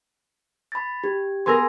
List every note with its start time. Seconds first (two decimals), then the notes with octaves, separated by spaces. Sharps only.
0.72 B5 A6
1.04 G4
1.46 B3 G#4 A#4 C6 E6 A#6